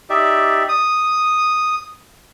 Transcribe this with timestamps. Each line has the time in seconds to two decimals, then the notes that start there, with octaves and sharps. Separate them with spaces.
0.10 D#4 G4 D5 E5
0.69 D#6